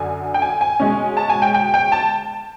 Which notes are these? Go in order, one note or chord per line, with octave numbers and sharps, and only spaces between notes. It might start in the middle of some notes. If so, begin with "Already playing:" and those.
Already playing: F#2 D3 D4 G#5
G5
G#5
G#5
B2 G#3 C#4
A5
G#5
G5
G5
G5
A5